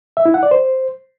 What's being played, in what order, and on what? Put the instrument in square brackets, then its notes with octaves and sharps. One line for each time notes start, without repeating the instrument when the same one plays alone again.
[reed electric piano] E5
E4
F#5
D5
C5